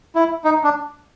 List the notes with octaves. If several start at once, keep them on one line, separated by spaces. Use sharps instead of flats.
E4
D#4
D4